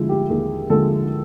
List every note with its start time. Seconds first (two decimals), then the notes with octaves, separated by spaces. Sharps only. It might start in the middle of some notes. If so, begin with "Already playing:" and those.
Already playing: D3 F3 G#3 E4
0.09 G4
0.30 D#2 G#4
0.70 D3 F3 G#3 A4